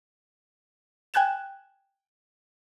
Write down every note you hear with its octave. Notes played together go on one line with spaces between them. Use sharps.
G5 G#5 F#6 G#6 E7